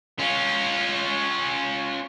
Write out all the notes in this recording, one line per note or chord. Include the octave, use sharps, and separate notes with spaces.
C#4 F4